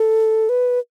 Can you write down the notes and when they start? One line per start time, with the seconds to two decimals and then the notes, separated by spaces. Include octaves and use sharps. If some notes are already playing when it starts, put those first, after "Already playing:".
Already playing: A4
0.49 B4